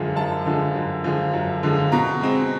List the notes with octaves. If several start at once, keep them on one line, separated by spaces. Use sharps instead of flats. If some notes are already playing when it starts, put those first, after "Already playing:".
Already playing: F#2 D3 F3 G#3
F#2 A5
D3 F3 G#3
F#2
D3 F3 G#3
F#2
D3 F3 G#3
B2 A#5
G#3 C4